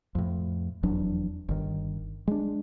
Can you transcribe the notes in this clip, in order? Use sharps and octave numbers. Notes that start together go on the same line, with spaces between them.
F2 A2
F1 E2 F#3 D4
G1 D#3
G#3 D4